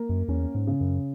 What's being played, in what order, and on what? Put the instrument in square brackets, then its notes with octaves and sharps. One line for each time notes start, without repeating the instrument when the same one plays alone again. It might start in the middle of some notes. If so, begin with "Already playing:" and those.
Already playing: [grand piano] A#3
[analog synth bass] F#2
[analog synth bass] E2 [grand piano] C#4
[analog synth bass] G#2
[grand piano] C#3
[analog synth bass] F#2